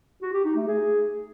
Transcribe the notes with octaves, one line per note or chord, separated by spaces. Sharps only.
F#4
G4
D#4
A3
G#4